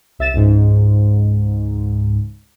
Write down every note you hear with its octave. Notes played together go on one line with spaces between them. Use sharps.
C2 E5 A6 E7
C#2 G#2